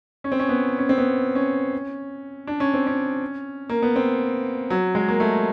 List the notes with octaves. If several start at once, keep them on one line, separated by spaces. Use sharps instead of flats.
C#4
C4
C#4
B3
C#4
C4
B3
C#4
D4
C#4
C4
C#4
A#3
B3
C4
F#3
G#3
A#3
A3